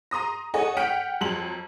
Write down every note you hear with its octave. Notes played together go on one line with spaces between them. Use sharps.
A#5 C6 D#6 A#6
A4 C#5 D#5 F#5 G#5
F#5 G5 F6 G6 B6 D7
F2 F#3 C6 F#7